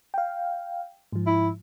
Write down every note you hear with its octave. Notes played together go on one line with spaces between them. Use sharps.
F5 G5
G#2 F3
E4